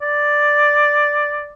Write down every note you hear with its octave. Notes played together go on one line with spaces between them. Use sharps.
D5